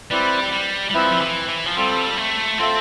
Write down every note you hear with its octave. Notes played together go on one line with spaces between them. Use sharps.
G3 C4 E4 B4 D5
G3
G3
F3 C4 E4 B4 E5
F3
E3
E3
F3
G3 C4 F4 A4
A3
C4 F4 A4 E5